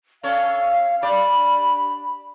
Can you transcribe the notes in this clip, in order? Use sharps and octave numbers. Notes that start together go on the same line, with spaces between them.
C#4 A4 C#5 F5
D4 G4 D5 B5